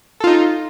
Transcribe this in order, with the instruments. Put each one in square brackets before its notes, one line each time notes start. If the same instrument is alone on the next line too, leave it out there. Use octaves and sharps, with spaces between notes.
[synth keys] A4
F4
D#4